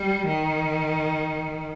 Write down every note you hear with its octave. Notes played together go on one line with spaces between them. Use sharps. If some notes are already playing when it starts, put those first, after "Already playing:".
Already playing: G3
D#3